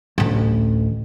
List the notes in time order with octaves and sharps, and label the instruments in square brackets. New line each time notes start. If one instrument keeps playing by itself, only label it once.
[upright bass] A1 D2